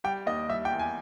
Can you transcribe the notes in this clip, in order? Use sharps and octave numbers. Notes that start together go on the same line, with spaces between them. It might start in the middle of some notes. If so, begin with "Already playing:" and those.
G3 G5
D#2 D#5
G3 E5
G5
E2
G#5